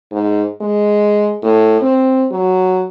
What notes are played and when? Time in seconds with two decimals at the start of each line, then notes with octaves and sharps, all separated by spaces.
0.12 G#2
0.61 G#3
1.43 A2
1.82 C4
2.31 F#3